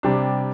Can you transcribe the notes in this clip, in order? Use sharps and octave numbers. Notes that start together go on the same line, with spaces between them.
C3 G3 D4